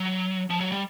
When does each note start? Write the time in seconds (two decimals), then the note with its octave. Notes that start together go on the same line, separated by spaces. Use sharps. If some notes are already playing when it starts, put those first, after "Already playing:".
Already playing: F#3
0.50 F3
0.60 F#3
0.72 G3